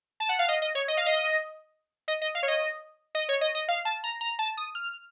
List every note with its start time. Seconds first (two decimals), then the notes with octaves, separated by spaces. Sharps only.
0.20 A5
0.29 F#5
0.39 F5
0.48 D#5
0.62 D#5
0.75 C#5
0.88 D#5
0.97 F5
1.06 D#5
2.08 D#5
2.22 D#5
2.35 F5
2.43 C#5
2.48 D#5
3.15 D#5
3.29 C#5
3.41 D#5
3.55 D#5
3.68 F5
3.85 A5
4.04 A#5
4.21 A#5
4.39 A5
4.57 D#6
4.75 F6